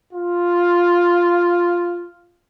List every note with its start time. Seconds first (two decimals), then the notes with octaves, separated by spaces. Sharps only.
0.13 F4